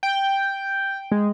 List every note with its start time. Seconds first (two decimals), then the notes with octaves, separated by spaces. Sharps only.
0.03 G5
1.12 G#3